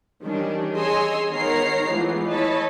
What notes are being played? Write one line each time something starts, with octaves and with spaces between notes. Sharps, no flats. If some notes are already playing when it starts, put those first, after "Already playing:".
D#3 E3 G3 C#4 D4
G#4 C#5 D#5 G#5 C6 E6
D#3 B3 A#4 C#5 A#5 C7
E3 F3 G#3 A3 B3
E4 C#5 D#5 A5 B5